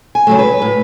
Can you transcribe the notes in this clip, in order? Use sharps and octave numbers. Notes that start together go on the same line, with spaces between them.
G#5
C#3 F#3 A3
B4
A2